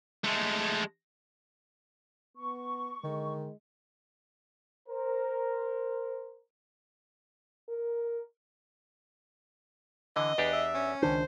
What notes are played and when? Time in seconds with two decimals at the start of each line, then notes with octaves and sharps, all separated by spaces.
0.24 G#3 A3
2.37 B3 C#6
3.04 D3 D#3 G#3
4.89 A#4 C5
7.69 A#4
10.16 D3 E3 D#5
10.38 E2 D4 G4 B4
10.53 E5
10.74 C#4
11.02 C#2 D#3 D4 C5